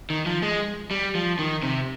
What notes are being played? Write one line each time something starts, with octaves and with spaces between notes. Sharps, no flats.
D#3
F3
G#3
G3
F3
D#3
C3